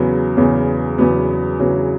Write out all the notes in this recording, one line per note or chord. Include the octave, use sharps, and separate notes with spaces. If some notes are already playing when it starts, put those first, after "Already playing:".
Already playing: E2 C#3 F#3 B3
E2 C#3 F#3 B3
E2 C#3 F#3 B3
E2 C#3 F#3 B3